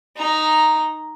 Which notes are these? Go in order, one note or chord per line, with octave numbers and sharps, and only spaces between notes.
D#4 A#5